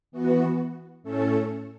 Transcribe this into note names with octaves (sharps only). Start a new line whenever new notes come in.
E3 B3 F#4
A2 A3 C#4 A4